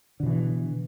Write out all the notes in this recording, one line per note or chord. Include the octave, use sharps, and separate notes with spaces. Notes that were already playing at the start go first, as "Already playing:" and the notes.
B2 D3 E3